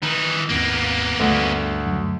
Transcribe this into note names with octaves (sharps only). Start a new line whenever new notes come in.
D#3 E3 D#4
G#1 D#2 A#3 B3
D2 G2
F#2 D3 F#3